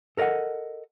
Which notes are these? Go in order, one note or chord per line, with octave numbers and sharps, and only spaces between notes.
A4 A#4 D5 D#5 F#5